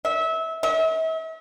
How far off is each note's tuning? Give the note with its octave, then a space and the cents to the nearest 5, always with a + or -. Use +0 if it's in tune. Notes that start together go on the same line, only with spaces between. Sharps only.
E5 -25
E5 -40